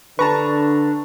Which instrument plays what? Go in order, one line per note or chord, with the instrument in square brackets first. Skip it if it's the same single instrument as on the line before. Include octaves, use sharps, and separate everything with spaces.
[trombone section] D3 [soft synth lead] D4 [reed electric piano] B4 [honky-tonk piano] A5 A#5 C#6